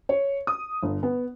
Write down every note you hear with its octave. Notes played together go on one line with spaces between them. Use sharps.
C#5
D#6
G1
B3